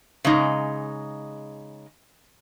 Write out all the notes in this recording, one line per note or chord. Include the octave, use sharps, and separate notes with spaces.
C#3 G#3 D#4